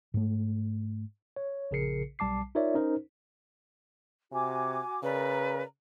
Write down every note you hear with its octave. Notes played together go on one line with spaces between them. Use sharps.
G#2 A3
C#5
A#1 C#3 G#4 A#4 C7 C#7
B1 G3 A5 D6 C7
D#4 F4 A#4 C#5 D5 E5
C#4 D#4 A#4 C5
C3 F#4 G#5 D6
C#3 A#4 B4 D5 A#5